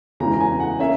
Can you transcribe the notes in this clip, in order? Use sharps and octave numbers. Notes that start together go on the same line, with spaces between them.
E2 C#3 E3 G#3 C#4 A#5
A#5
G#5
F#5
A#3 C#4 E5